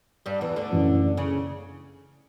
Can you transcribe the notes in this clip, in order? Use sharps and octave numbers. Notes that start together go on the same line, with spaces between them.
G2 G3
E2 E3
D2 D3
F#1 F#2 E3
C#3